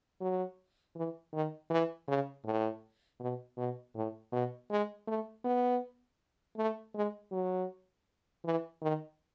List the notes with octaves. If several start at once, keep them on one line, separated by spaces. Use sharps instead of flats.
F#3
E3
D#3
E3
C#3
A2
B2
B2
A2
B2
G#3
A3
B3
A3
G#3
F#3
E3
D#3